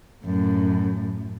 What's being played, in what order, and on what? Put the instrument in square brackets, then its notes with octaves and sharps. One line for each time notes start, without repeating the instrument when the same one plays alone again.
[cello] F#2 A2